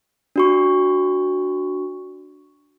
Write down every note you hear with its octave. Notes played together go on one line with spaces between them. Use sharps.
D4 F#4 C#6